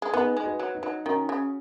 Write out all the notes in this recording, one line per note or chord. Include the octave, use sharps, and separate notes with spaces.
G#3
B3 D#4 G#4
G#3
F#4 B4
F#3
D#4
F#3
D#3 C#4 F#4
C#3